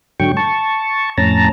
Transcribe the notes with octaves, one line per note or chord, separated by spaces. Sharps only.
G#2 D3 F#3 G5 C#6
A5 C#6
F2 A2 C#4 A5 A#5